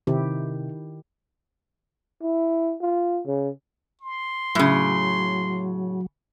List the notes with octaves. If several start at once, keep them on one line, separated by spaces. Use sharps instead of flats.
C3 D#3 E4 G4
E4
F4
C#3
C6
A2 C#3 F#3